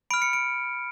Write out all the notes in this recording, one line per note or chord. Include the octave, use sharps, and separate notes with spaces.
B5 F6 D7
C#7
D7